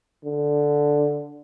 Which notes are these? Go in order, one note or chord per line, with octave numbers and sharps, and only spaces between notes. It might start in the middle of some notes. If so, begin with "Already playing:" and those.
D3